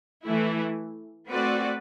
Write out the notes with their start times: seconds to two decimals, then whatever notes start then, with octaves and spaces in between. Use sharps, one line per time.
0.24 E3 A3 E4
1.28 A3 C4 F#4 B4 D5